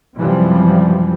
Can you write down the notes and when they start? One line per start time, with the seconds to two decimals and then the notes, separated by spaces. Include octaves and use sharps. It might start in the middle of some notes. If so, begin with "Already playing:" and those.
0.17 F#2 C3 E3 F3 G3